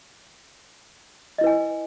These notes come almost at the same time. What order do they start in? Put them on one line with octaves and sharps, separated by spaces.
D#5 E4 B4 G#5